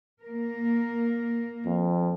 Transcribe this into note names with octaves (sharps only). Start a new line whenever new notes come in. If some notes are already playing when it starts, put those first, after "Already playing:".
A#3 A#4
F2